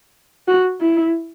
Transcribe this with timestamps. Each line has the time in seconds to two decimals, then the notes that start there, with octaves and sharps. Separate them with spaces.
0.48 F#4
0.81 E4